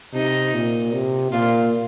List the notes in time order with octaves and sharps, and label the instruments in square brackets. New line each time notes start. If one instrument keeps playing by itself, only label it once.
[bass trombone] C3 [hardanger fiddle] D#4
[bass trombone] A#2
C3
[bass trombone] A#2 [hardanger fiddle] F4